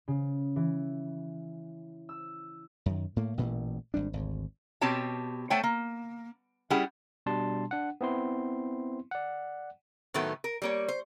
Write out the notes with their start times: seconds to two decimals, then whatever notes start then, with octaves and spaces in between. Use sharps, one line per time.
0.08 C#3
0.56 E3
2.09 E6
2.86 F#2 D#3
3.16 A2 A3 A#3
3.37 A1 A#2 E3 A3
3.94 G#1 G3 D4
4.13 G#1 D2
4.81 B2 C4 G4 C#5 A5
5.50 A3 A4 C5 C#5 F#5 G5
5.63 A#3
6.70 G3 C#4 E4 G#4 F#5
7.26 B2 G3 D4 A5 C6
7.71 D4 F#5
8.01 B3 C4 E4 C6
9.11 D5 F#5
10.14 A2 D#3 F#3 A3 B3
10.44 A#4
10.62 G3 A#3 C#5
10.88 C5